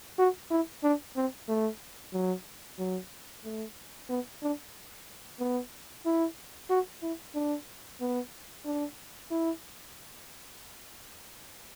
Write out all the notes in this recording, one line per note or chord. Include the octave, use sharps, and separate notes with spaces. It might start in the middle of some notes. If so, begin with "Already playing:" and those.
F#4
E4
D4
C4
A3
F#3
F#3
A3
B3
D4
B3
E4
F#4
E4
D4
B3
D4
E4